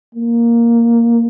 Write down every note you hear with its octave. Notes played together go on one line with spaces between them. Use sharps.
A#3